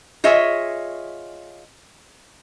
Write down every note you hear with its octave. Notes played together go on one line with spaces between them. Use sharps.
F4 G#4 C#5 D#5 E5